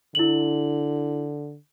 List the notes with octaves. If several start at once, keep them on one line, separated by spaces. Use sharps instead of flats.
D3 E4 F#7